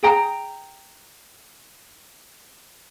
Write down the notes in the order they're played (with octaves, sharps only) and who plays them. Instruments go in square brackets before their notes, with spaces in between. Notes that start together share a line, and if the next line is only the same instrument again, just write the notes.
[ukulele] G#4 G5 A#5